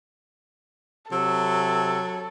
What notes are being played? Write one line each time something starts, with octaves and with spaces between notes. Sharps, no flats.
C3 F#3 A4 E6